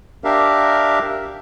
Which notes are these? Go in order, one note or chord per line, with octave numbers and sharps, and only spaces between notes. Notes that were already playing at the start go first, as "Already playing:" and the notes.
D4 G4 A#4 E5 F5